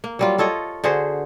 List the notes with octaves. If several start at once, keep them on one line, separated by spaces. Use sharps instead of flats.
A#3
F#3 G3 F4
F4 A4 C#5 D#5
D3 F#4 G#4 C5